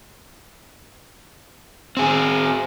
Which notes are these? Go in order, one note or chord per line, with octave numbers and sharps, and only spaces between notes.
C4 G#4